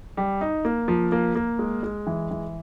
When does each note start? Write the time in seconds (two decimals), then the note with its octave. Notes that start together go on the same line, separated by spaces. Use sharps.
0.17 G3
0.41 D#4
0.65 A#3
0.88 F3
1.12 A#3
1.35 A#3
1.59 G#3
1.83 G#3
2.07 E3
2.31 E3